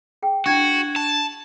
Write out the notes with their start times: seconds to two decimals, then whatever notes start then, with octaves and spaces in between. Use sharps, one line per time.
0.22 G#4 G5
0.46 D4 E4 F#4 G5 C#6 G#6
0.96 A5